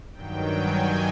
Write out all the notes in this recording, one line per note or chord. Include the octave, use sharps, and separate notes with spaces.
G2 D#3 F#3 G5
G#5